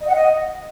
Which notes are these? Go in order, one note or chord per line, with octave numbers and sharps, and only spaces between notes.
D#5
F#5
D#5